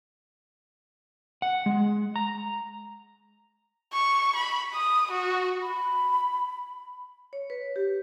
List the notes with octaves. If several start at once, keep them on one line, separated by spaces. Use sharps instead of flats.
F#5
G#3
A#5
C#6
B5
D#6
F#4
B5
C#5
B4
G4